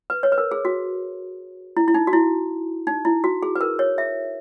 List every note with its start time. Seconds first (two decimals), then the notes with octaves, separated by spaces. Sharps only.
0.10 B4
0.23 C#5
0.32 B4
0.38 A#4
0.51 G#4
0.65 F#4
1.77 E4
1.88 E4
1.94 D#4
2.07 F#4
2.13 E4
2.87 D#4
3.05 E4
3.24 F#4
3.43 G#4
3.55 B4
3.61 A#4
3.79 C#5
3.98 E5